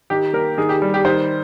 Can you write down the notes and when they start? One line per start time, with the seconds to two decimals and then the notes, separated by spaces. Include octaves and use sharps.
0.10 D#3 G4
0.33 A#3 A#4
0.58 D#3 G#4
0.69 G4
0.82 G3
0.94 G4
1.05 D#3 C5